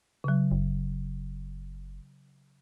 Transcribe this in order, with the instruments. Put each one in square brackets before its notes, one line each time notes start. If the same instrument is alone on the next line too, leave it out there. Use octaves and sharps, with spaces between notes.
[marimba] C#3 F#3
[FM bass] F#1